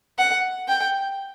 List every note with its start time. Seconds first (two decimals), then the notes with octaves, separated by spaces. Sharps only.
0.18 F#5
0.68 G5